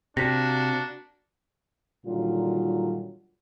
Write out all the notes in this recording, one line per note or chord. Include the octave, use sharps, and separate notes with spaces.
C3 A#3 D4 F#4 A#6 B6
A#2 D3 D#3 F#3 G3 F4